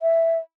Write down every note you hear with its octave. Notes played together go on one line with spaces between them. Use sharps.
E5